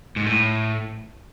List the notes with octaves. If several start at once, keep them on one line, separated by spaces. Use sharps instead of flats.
G#2
A2